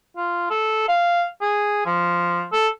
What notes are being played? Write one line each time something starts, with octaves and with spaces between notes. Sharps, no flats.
F4
A4
F5
G#4
F3
A4